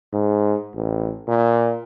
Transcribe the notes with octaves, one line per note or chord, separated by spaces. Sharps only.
G#2
A1
A#2